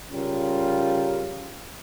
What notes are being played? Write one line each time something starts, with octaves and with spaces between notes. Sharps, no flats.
C#3 G3 C#4 F4 A#4